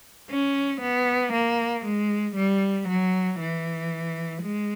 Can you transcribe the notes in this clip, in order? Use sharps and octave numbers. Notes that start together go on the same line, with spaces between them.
C#4
B3
A#3
G#3
G3
F#3
E3
G#3